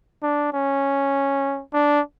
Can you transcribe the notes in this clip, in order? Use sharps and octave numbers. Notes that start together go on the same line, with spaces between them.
D4
C#4
D4